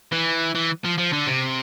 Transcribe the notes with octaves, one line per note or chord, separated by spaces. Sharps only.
E3
E3
F3
F3
D3
C3